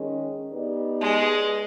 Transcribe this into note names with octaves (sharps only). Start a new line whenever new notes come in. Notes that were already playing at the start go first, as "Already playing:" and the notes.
Already playing: D#3 G#3 C#4
B3 D#4 G4 B4 D5
G#3